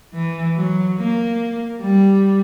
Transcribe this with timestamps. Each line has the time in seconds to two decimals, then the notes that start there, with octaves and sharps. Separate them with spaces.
0.14 E3
0.56 F#3
0.98 A#3
1.81 G3